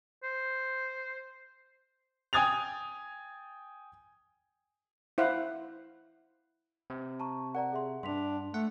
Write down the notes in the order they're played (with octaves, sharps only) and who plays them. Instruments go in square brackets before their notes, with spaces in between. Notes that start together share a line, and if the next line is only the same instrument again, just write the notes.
[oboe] C5
[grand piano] G5 G#5 D#6 G#6 A6 F7
[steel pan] E4 C5 F5 F#5
[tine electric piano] C3
[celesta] A5 A#5 C#6
[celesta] A#4 D5 A#5 [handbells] F#5
[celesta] G#4 E5 C6
[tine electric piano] G2 [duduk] D4 [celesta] C6 B6 F7
[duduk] A3 [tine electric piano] F#5